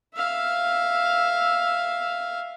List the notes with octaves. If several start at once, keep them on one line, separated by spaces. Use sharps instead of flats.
E5 F5